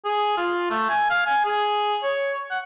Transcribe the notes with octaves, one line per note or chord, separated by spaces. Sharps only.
G#4
F4
A3
G#5
F5
G#5
G#4
C#5
F#5